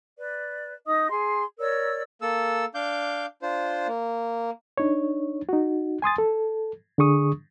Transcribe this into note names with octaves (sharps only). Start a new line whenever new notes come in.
B4 D5
D#4 D#5 D#6
G#4 C6
A#4 C#5 D5 E6
A#3 A4 E6
D4 F5 D6 G6
D4 F4 C5
A#3
D4 D#4 C#5
D#4 F#4
G#5 C6 D#6 A6
A4
D3 D4 G#4 C#6 D#6